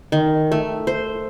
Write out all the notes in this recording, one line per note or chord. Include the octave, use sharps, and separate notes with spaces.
D#3
A3
C5